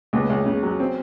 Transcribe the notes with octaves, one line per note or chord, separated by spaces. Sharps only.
C#2 B3
C#2
C#3
F#3
C4